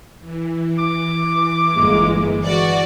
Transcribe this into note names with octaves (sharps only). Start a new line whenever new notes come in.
E3
D6
G1 G#3 A#3
F#4 D5